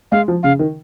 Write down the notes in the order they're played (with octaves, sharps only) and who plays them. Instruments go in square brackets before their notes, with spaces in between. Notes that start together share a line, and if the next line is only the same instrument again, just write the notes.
[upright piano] G#3 [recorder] F5
[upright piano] F3
[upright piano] C#3 [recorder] F5
[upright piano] D#3